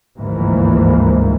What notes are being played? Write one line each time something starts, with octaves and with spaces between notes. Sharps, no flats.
G1 D2 G#2 E3 F3 A#3